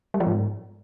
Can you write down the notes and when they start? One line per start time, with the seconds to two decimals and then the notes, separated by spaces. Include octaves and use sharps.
0.14 G3
0.20 F3
0.27 G#2